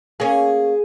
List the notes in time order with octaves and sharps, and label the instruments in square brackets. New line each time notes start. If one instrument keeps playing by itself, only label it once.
[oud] A#3 C#4 [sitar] G#4